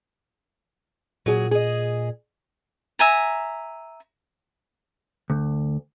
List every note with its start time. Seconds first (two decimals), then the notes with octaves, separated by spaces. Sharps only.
1.26 A#2 F#3 G#4
1.51 G#4 D#5
2.99 E5 G#5 A#5
5.30 D2